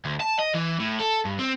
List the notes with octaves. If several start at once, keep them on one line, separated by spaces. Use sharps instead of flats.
D2
A5
D#5
E3
A2
A4
G2
C4